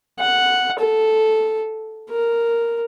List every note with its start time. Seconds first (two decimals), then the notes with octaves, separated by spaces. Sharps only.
0.19 F#5
0.79 A4
2.10 A#4